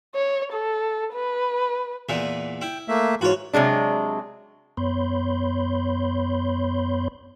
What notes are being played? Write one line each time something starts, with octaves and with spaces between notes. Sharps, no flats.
C#5
A4
B4
E2 A#2 E3
E4 G5
A3 A#3 E5
G#2 E3 F4 F#4 C#5
C3 F#3 G#3 D4
F#2 B3 C#5 B5 C6 G6